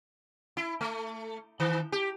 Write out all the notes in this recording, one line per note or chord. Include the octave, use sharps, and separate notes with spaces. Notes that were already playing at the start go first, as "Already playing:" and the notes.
E4
A3
D#3
G4